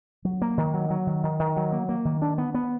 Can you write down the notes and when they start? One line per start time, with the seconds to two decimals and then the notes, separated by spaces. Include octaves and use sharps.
0.25 F#3
0.42 A#3
0.58 D#3
0.74 F#3
0.90 F#3
1.07 D#3
1.23 D#3
1.39 D#3
1.57 F#3
1.72 A#3
1.89 A#3
2.05 D#3
2.22 D4
2.38 B3
2.54 B3